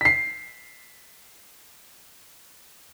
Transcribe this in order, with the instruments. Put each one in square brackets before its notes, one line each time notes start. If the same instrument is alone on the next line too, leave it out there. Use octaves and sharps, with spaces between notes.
[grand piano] B6 C7